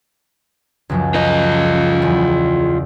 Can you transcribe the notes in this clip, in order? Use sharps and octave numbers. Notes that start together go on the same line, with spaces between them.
C#2 F#2 F3
F4 D#5
E2 F#3